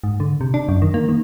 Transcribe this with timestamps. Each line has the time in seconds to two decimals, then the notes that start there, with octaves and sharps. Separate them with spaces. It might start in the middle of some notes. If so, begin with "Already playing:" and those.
0.04 G#2
0.20 D3
0.41 C3
0.54 D4
0.69 F#2
0.82 D#3
0.94 A#3
1.09 D#3